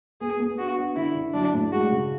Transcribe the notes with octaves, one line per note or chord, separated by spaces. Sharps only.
B3 G#4
B3
D4 F#4
D4
D3 E4
D3
F#3 D4
A2
G#3 F#4
C#3